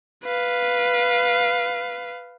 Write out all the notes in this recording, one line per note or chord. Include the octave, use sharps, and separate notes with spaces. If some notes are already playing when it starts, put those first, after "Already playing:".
B4 F5